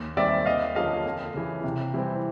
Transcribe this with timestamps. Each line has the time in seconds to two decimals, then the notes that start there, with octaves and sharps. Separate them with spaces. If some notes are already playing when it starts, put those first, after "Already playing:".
Already playing: D#2
0.17 D#3 G3 C4 D5 E5
0.46 D#2 D#5 F5
0.75 D3 F3 A#3 C#4 D#5 F5
1.06 F2
1.34 C#3 E3
1.64 C3
1.94 E3 G3 C4